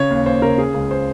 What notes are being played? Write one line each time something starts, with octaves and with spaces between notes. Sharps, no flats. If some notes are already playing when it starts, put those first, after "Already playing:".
Already playing: C#3 C#5
D#2
D#2 C5
C#3 A#4
C#3 G#4
C#2
C5